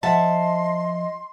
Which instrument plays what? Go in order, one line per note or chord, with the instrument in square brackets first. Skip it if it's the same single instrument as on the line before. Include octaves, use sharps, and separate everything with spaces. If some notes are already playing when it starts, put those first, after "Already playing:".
[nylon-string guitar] F3 E5 F#5 [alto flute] D#5 [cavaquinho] A5 [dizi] C6